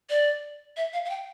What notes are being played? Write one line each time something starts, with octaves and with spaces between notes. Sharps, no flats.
D5
E5
F5
F5
G5